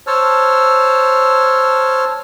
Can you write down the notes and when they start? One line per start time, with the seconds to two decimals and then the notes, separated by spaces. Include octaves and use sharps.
0.07 C5 C#5 A5 E6 F6